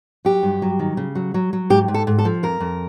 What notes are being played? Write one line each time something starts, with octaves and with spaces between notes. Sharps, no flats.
F#3 G4
G2
F#3
D#3
C#3
F#3
F#3
F#3
G#2 G4
G#2
A4
G#2
A4
F3
F2 A#4
F2